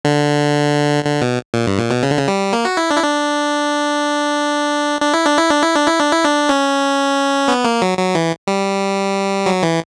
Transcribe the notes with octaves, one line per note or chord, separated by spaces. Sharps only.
D3
D3
B2
A#2
G2
A#2
B2
C#3
D3
C#3
G3
A#3
F#4
E4
D4
E4
D4
D4
E4
D4
E4
D4
E4
D4
E4
D4
E4
D4
C#4
B3
A#3
F#3
F#3
E3
G3
F#3
E3